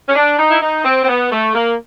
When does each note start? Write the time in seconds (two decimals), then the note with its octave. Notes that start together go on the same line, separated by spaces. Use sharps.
0.09 C#4
0.15 D4
0.39 D#4
0.51 E4
0.62 D#4
0.85 C4
1.04 C4
1.08 B3
1.32 A3
1.55 A#3